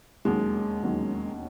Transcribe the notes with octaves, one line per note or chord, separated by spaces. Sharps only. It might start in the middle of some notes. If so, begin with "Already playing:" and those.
E1 D#2 D#3 F#3 G#3 C#4
E1 D#2 D#3 F#3 C#4